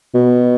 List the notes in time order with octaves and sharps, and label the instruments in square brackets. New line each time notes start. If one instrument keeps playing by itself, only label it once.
[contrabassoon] B2